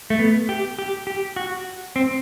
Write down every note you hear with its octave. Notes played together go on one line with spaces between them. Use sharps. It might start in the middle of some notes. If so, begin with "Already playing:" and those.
A3
B3
G4
G4
G4
F#4
C4